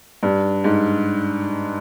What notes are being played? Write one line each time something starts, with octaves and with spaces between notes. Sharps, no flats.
G2
G#2